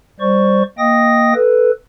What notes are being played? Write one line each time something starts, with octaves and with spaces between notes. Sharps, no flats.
G3 C5 D5 C#6
A#3 D#5 G5 D#6 A#6
A4 B4